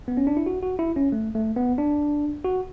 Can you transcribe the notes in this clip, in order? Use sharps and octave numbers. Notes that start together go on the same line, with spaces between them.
B3
C#4
D4
E4
F#4
F#4
E4
C#4
A3
A3
B3
D4
F#4